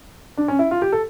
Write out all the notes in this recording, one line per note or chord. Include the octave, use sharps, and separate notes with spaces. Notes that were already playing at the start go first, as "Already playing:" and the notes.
D4
C#4
E4
F4
G4
A4